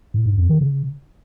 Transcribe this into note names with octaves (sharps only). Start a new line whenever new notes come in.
A2
G#2
F2
D#3
C#3